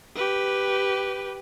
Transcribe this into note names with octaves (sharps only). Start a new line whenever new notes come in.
G4 B4